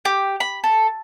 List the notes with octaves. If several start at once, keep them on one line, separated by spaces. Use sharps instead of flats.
G4
B5
A4